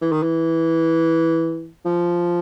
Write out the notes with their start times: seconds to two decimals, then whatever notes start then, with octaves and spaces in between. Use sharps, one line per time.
0.02 E3
0.12 D#3
0.23 E3
1.85 F3